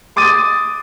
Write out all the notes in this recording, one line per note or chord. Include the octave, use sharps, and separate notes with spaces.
C6 D6 D#6 A6 D#7